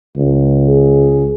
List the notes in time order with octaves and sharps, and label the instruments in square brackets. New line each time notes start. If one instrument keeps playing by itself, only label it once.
[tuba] C#2
[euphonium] G#4